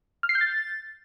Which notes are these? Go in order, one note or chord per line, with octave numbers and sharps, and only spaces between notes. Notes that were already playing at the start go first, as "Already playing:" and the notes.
F6
C7
G6
A6